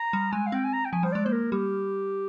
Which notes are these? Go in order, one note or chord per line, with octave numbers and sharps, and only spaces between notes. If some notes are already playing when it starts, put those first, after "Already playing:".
Already playing: A#5
G3
G#3 G#5
F5
C4 G5
G#5
A#5
G5
F3 G#5
G3 C5
G#3 D5
A#3 C5
A#4
G3 G4